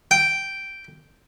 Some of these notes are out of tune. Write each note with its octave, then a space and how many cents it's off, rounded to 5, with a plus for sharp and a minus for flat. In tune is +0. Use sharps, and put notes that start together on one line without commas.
G5 -5